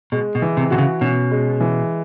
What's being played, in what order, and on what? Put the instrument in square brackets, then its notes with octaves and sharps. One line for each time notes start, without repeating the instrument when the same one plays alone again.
[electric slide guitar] B2 [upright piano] G#3
[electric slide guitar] B2
[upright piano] E3
[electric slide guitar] C3
[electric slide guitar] C3 [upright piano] F#4
[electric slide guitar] C#3
[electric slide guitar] B2 [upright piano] C#4
[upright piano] G#3
E3